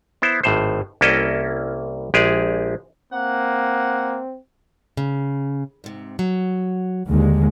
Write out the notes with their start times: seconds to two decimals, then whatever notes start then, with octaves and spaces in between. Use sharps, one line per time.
0.22 B3 E4 C5
0.43 G#1 A2 C5
1.01 C2 A#3 C#4 E4 A4 D#5
2.14 A#1 G#3 G4 G#4
3.13 A#3 C4 F#5
4.97 C#3
5.84 G#2 C3
6.19 F#3
7.07 D#2 D3 G#3